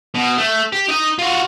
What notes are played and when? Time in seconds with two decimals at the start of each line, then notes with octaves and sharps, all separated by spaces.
0.15 B2
0.38 A3
0.72 G4
0.89 D#4 D#5
1.19 F4 F#4